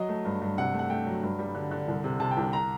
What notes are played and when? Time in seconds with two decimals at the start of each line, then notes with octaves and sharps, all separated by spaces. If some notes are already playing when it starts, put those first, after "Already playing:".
Already playing: F#3 D#5
0.09 A3
0.25 G2
0.41 G2
0.58 C3 F#5
0.74 A3
0.79 F#5
0.90 A3 G5
1.07 F#3
1.23 G2
1.39 G3
1.55 D3
1.71 D3
1.88 C2
2.04 C3
2.20 C3 A5
2.31 G5
2.37 C2
2.53 A#5